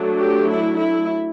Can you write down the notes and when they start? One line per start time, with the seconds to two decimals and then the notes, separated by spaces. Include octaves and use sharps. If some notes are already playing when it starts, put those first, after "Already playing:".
Already playing: F#3 A3 D4
0.19 G4
0.49 E4
0.79 E4